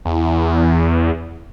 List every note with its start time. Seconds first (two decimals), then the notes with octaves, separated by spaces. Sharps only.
0.05 E2